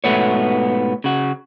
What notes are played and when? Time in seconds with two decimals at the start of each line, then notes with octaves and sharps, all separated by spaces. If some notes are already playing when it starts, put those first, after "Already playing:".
0.04 G#2 B2 E3 A3 B3 C#5
1.04 C#3 F#4